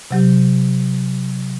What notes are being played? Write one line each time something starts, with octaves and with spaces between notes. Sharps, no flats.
C3 F#3 G4